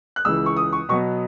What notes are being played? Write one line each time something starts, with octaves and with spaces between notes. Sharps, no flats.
F#6
C#2 C#3 E3 E6
C#6
D#6
C#6
B2 F#3 B3 C#6